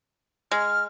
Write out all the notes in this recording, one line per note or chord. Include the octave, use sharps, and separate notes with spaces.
G#3 F6